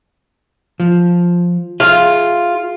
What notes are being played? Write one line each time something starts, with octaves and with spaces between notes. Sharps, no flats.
F3
F4 G#4 E5